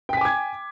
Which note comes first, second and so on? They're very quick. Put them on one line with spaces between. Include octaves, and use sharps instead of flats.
G5 B6 G#5 D6 G#6